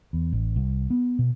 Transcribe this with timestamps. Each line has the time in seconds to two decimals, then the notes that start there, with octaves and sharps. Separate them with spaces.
0.13 E2
0.32 A1
0.56 C2
0.90 B3
1.19 B2